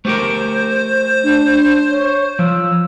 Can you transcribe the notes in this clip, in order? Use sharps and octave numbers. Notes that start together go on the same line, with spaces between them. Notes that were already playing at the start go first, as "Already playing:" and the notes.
A3 G4 A#4 C5
D4
C#5
F3 E6